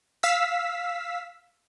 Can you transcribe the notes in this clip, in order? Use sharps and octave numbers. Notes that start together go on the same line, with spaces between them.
F5 E6 B6